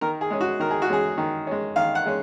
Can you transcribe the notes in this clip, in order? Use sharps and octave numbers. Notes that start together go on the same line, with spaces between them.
D#3 A#4
G#4
G#3 C#4
F#4
D#3 A#4
G#4
F#4
G#3 C#4 G#4
D#3
G#3 C#4
D#3 F5
F#5
G#3 C#4